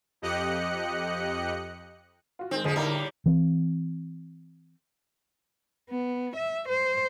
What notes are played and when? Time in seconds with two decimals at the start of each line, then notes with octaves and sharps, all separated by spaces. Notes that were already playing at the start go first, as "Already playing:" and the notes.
0.22 F2 G4 D#5 F#6 C#7
2.39 F4 F#4
2.51 D#3 G#3 C4
2.64 F1 D3 F3 G#3 G#4 D#5
2.76 A2 G3 A#3 D#4 E4 A#4
3.26 E3 C4
5.90 B3
6.37 E5
6.69 C5